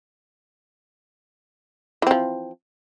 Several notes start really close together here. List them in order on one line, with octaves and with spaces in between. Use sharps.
E3 C4 F3